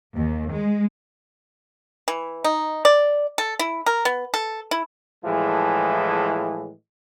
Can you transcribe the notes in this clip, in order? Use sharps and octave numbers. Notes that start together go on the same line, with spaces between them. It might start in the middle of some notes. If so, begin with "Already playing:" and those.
D#2
G#3
E3
D#4
D5
A4
E4
A#4
B3
A4
E4
A2 E3 F3 G#3 G#4